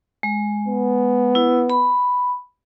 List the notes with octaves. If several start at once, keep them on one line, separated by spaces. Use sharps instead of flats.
G#3
B3
E4
B5